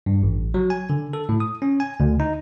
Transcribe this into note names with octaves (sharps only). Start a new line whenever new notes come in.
G2
A1
F#3
G#5
D3
A4
A2
D#6
C#4
G#5
D2
D#4